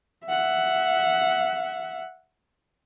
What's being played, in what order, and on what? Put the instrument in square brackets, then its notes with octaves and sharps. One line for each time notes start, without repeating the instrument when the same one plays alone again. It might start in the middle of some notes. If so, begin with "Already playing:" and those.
[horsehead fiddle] E5 F#5